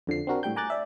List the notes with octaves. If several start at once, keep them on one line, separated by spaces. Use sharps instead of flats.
F2 D3 F3 C7
C4 D4 F#4 A#4
A2 G3 G5 G6
G#5 A#5 D6 F#6 G6 A6
D5 E5